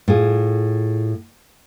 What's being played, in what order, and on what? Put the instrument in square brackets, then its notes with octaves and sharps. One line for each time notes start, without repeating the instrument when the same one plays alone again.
[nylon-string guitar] A2 F4 G#4